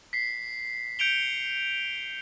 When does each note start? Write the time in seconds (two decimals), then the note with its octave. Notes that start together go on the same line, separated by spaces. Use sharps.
0.13 B6 C7
0.99 G6 C#7 D7 F7 G7